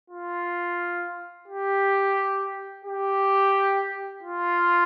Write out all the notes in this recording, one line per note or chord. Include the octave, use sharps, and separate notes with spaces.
F4
G4
G4
F4